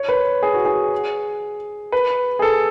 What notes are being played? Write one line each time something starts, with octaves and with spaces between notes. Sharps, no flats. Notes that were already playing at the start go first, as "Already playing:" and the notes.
Already playing: C#5
B4
G#4
F#4
G#4
B4
G#4
A4